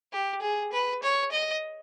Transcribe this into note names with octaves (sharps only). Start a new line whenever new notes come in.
G4
G#4
B4
C#5
D#5